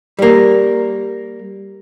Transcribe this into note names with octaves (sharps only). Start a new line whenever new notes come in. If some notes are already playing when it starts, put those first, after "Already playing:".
G3 A#3